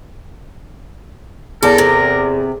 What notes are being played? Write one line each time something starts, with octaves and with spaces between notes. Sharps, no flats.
E2 A4 A#4
C3